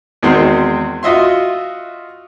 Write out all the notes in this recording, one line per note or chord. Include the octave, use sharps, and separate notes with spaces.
E2 D#3 G#3 C4 F#4
F4 F#4 D#5 E5 C6